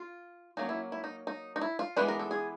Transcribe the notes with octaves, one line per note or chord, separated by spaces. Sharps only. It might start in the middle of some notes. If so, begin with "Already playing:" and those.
Already playing: F4
F#3 A#3 C#4 D#4
E4
E4
D#4
D#4
D#4
E4
F4
E3 G#3 B3 D4 B4
A#4
A4
G#4